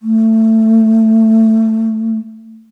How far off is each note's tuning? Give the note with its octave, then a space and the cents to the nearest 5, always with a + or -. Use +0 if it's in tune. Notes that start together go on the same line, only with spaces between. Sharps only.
A3 +15